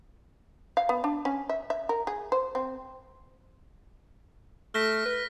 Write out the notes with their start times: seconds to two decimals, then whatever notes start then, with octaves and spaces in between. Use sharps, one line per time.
0.77 F5
0.89 B3
1.04 D4
1.25 C#4
1.49 E5
1.70 E5
1.89 A#4
2.07 G#4
2.32 C5
2.55 C4
4.74 A3 F6 A#6 B6
5.06 B4